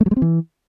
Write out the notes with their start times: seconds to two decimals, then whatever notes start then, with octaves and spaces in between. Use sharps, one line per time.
0.01 A3
0.06 F#3
0.11 G#3
0.16 C4
0.22 E3